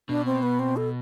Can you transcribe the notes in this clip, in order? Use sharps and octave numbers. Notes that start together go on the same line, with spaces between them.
B2 D4
C4
B3
C4
A4